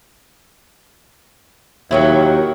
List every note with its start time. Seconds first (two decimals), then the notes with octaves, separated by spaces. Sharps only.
1.91 D#2 D#3 F#3 E4